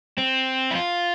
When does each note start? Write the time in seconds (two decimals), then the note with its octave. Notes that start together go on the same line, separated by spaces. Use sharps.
0.18 C4
0.71 E4
0.75 F4